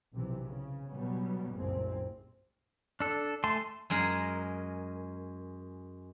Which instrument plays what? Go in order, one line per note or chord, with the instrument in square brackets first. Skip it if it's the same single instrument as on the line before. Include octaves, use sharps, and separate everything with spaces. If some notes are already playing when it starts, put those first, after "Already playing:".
[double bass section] B1 C3 E3
C#3
B2 F#3 G3 B3 C#4
F#1 C2 A#2 G#3 C4
[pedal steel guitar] D4 A4
A3 G#5 A5 C6
[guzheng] F#2 G#3 G#4 A#4